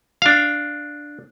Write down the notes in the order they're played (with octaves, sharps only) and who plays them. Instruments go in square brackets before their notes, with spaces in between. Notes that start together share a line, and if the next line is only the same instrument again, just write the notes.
[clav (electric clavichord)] D4 F5